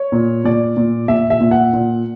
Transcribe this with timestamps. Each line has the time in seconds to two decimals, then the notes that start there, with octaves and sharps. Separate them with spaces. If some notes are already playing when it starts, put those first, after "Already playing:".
Already playing: C#5
0.12 A#2
0.44 A#2 D5
0.77 A#2
1.08 A#2 E5
1.30 E5
1.41 A#2
1.51 F#5
1.74 A#2